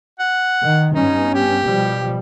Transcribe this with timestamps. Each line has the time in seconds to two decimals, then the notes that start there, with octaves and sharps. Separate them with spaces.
0.19 F#5
0.62 D#3
0.93 G2 B3 C#4 D#4
1.34 G4
1.64 B2 F3 G3